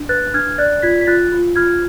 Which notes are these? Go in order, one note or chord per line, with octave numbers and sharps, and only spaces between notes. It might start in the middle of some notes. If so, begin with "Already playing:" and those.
Already playing: D4
B4 F#6 A6
D4 F6 G#6
D5 F#6 A6
F4 G#6 B6
B6
F4 F#6 A6
F4
F4 F6 G#6